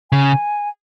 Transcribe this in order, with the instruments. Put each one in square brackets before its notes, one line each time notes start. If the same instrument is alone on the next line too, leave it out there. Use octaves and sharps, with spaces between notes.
[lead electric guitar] C#3 [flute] G#5